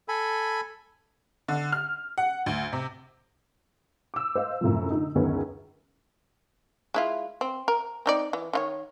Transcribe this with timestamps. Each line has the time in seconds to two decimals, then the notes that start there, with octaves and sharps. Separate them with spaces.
0.08 A4 G#5 B5
1.48 D3
1.72 F6
2.18 F#5
2.46 D2
2.73 C3
4.14 D6 E6
4.35 C5 D#5 F5
4.61 F#2 A2 C3 F3
4.90 D3 D#4
5.15 C#2 F#2 D3 D#3 B3 C#4
6.94 G#3 E4 F4
7.41 C4
7.68 A#4
8.06 C4 D#4 D5
8.33 E3
8.53 D#3 F4 C#5